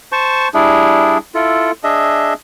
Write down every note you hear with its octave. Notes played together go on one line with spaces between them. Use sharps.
C5 A5 C#6
G3 D4 E4 G#4
E4 F4 A4
D4 G#4 D#5 E5